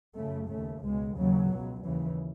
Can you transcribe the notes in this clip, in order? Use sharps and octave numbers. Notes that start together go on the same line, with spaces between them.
F#2 C#3 A3
D#2 C#3 A3
C#2 B2 G#3
D#2 C#3 F#3
C#2 B2
D#2 C#3 E3